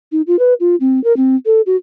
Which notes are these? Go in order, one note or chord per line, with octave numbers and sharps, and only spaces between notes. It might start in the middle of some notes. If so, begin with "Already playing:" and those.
D#4
F4
B4
F4
C4
A#4
C4
A4
F#4